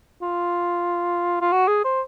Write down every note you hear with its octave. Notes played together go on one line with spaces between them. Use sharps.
F4
F4
F#4
G#4
C5